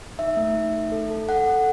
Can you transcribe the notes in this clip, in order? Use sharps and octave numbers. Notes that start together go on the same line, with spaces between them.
D#4 E5
A3
D#4
A3
A4
A4
A4 F#5
A4